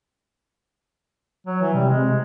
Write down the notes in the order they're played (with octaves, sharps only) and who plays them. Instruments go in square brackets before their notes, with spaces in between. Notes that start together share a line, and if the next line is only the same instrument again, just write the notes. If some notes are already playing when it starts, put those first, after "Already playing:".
[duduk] F#3
E3
[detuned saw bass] C3 [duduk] G3
[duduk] G#3